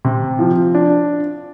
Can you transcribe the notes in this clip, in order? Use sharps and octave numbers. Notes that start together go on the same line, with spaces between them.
C3
F3
D4